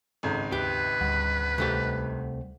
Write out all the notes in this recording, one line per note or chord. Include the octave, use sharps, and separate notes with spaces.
G#1 C#2 A4 A#5 F#6
D#2 G4 B4 E5 F#6
D2 G3 F#5
C2 A3 G4